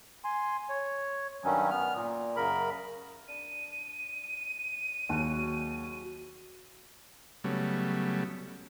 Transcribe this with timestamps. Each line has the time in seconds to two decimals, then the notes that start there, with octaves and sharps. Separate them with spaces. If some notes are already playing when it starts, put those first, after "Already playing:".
0.24 G#5 C6
0.69 C#5
1.44 G2 D#3 F#3 G3 C#4
1.71 B3 F6
1.95 A#2
2.36 F#2 C#3 A#4 B5
3.28 D4 D#7
5.09 D#2 F#3 G#3 F#4
7.44 C#3 F#3 G3 A3 B3